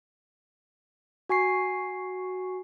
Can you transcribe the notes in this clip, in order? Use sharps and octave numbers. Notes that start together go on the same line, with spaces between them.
F#4 G#5 C#6 C7